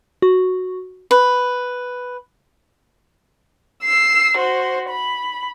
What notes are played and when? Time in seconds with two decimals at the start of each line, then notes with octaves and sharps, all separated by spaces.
0.22 F#4
1.11 B4
3.83 E6 C7
4.37 F#4 C5
4.90 B5